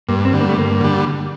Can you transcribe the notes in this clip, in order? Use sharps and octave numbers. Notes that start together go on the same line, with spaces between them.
G2 A#3
C4
D3 G3
A#3
A3
G2 A#3
D3 G3